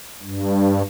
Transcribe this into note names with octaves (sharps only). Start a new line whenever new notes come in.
G2